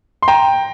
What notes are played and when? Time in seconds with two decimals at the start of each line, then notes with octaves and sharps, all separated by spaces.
0.22 C6
0.28 G5 A#5